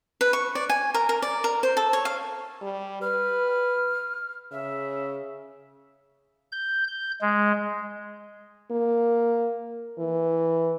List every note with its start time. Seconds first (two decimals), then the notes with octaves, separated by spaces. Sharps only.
0.21 B4
0.33 C#6
0.55 D5
0.69 G#5
0.94 A#4
1.09 A#4
1.22 D5
1.44 A#4
1.63 C5
1.77 A4
1.93 C#5
2.05 F5
2.62 G3
3.02 B4 F6
4.52 C#3 E5
6.52 G6
6.88 G6
7.22 G#3
8.71 A#3
9.99 E3